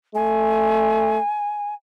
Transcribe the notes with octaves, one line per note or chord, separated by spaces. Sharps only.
A3 G#5